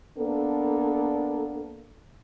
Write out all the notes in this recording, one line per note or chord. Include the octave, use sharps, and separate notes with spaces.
A#3 B3 D4 A4